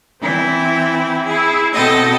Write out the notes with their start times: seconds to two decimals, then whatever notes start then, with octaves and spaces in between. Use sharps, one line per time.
0.21 E3 C4 E4
1.26 E4 G#4
1.73 B2 C4 A4 D#5